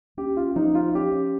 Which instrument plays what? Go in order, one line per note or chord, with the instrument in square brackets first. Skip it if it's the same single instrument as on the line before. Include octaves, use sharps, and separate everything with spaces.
[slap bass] C#4 [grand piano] G4
[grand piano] F4
[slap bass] F3 [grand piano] D#4
[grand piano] F4
[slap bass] C#4 [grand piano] G4